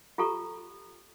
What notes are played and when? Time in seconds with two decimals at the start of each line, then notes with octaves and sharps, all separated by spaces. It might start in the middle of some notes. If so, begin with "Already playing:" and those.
0.18 F4 G4 A4 A#5 C#6